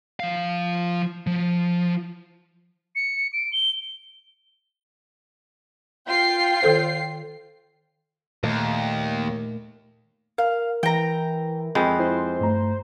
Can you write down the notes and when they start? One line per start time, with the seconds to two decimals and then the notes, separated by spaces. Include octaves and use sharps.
0.20 F3 F5
1.27 F3
2.96 C#7
3.33 D7
3.53 G7
6.08 F4 G5 C7
6.62 D#3 A4 C5
8.43 D#2 A#2 A3
10.38 A#4 F5
10.83 E3 G5 A#5
11.75 F2 G#3 B4 G5
11.99 E4 C5
12.41 G2 A3 A#5